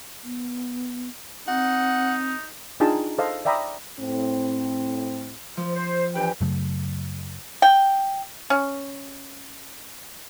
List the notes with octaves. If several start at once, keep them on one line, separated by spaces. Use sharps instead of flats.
B3
C4 D#4 F#5
D4 D#4 F4 G#4 G5 A5
A4 C5 D#5 F5
D5 E5 G5 A#5 B5 D#6
A2 C4
F3
C5
G2 E3 B4 G5
F#2 C#3 F#3 A3
G5
C#4